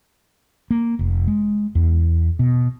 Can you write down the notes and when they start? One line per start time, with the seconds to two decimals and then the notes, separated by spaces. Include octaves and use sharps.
0.71 A#3
0.99 F1
1.27 G#3
1.75 E2
2.39 B2